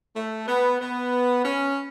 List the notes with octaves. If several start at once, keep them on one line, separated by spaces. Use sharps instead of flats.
A3
B3
B3
C#4